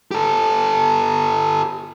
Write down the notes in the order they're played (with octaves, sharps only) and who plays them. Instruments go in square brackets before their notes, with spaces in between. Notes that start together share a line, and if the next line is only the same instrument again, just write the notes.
[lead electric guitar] G4 A4